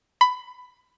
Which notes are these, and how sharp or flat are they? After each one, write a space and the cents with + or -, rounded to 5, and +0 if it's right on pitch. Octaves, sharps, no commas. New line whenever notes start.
B5 +15